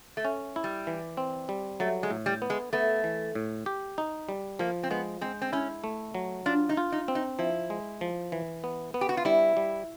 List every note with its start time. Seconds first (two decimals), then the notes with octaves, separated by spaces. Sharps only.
0.17 A3
0.25 C#4
0.56 E4
0.64 G3
0.87 E3
1.17 C4
1.49 G3
1.80 F#3 A3
2.03 G#3
2.11 A2
2.26 G3
2.42 B3
2.50 G#3
2.73 A3 B3
3.04 E3
3.35 A2
3.66 G4
3.98 D#4
4.29 G3
4.59 F3 A#3
4.83 C4
4.91 G#3 B3
5.22 G#3 C4
5.41 C4
5.53 C#4 E4
5.84 A3
6.15 F#3
6.46 D4 F4
6.69 D#4
6.77 F4
6.92 D#4
7.08 C4
7.15 D#4
7.39 F3 E4
7.70 G#3
8.01 F3
8.32 E3
8.64 B3
8.94 B3
9.01 G4
9.09 F#4
9.17 F4
9.25 G3 E4
9.57 G3